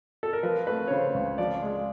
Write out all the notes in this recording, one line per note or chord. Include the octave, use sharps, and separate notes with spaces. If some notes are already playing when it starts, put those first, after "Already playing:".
A4
A#4
F3 B4
A3 B4
C#5
C#3 C5
C#2
F3 D5
G#3